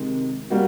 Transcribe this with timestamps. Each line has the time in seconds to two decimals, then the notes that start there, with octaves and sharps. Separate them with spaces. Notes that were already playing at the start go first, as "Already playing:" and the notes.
Already playing: C3 D#3 G#3
0.50 G3 A#3 F#4